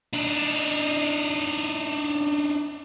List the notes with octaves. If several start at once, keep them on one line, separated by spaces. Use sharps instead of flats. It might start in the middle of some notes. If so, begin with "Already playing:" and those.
D4 D#4